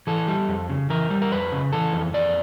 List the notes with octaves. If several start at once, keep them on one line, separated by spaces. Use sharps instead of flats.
E3 A4
G3
F2
C#3
E3 A#4
G3
A#4
F2 B4
C#3
E3 A4
F2
F2 D5